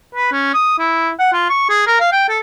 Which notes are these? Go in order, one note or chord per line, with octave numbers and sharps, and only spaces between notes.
B4
C#4
D#6
E4
F#5
F4
C#6
G#4
A#4
F5
G5
A4